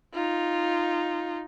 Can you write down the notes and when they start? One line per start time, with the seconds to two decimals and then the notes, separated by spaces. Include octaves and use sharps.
0.14 D#4 F4